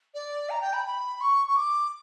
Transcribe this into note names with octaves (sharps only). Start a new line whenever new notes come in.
D5
A#5
G5
B5
B5
C#6
C#6
D6